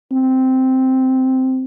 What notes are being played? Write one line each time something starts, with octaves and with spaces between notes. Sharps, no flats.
C4